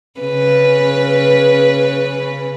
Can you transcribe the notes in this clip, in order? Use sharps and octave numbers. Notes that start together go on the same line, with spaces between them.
C#3 B4